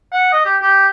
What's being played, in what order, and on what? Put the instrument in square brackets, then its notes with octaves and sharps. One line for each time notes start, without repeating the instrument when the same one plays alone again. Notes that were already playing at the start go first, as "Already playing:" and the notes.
[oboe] F#5
D#5
G4
G4